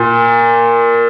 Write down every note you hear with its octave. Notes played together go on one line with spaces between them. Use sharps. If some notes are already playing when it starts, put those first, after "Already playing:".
Already playing: A#2